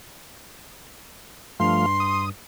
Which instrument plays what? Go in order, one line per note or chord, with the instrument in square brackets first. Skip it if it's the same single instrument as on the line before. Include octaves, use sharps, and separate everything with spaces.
[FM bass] G2 [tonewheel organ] F3 A3 F5 [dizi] C6
[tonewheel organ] D#6